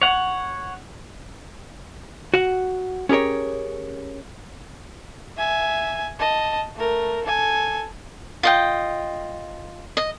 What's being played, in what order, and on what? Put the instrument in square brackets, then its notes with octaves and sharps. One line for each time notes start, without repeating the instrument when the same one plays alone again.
[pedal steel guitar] C#5 F#5
[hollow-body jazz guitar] F#4 F#5
C#4 G4 G#4 A#4 C#5
[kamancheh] E5 G#5
D#5 A5
A3 A#4
A4 G#5
[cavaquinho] F4 D#5 G5
D#5